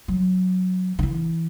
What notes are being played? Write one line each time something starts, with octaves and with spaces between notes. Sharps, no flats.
F#3
D3
E3